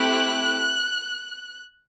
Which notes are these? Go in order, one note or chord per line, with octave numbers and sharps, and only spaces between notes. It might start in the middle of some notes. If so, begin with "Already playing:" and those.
Already playing: A3 C4 E4 G4 F#6